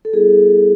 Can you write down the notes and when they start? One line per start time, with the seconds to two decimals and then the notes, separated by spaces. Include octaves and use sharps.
0.05 A4
0.13 G3 B3 E4 G#4